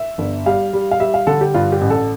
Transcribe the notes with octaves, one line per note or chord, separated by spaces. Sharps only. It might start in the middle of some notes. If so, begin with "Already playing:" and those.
Already playing: E5
G1
G3 F5
G3
F5
G3 E5
F5
D3 A4
G4
G2 F4
G4
A1
A4